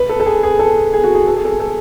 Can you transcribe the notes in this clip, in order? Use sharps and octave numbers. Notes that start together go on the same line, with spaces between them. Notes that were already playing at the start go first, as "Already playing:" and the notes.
Already playing: B4
A4
A4
G#4
G#4
A4
G#4
F#4
G#4
A4
G#4
A4
A4